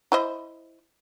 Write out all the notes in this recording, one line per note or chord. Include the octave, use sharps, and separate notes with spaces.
E4 C5 D#5